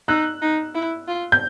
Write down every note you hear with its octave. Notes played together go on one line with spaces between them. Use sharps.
D#4 E6 F#6
D#4
E4
F4
G6